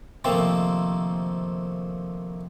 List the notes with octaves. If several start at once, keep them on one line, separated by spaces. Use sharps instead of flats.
C3 D#3 F3 A3 A#3 C4